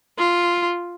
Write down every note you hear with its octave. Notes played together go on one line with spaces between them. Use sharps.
F4